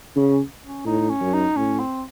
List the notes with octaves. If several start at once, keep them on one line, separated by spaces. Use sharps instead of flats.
C#3 C#4
C#4
A2 D#4
C#4
F#2
D#4
A2 C#4
C4